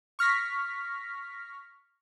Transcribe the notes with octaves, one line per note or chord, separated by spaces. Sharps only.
C#6 F6 A#6 B6